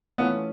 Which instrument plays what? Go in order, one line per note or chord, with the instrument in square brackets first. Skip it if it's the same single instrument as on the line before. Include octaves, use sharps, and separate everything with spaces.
[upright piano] E3 A3 C#4 F4 [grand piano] B3